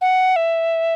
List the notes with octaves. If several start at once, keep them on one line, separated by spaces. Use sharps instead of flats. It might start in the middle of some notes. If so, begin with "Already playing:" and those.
F#5
E5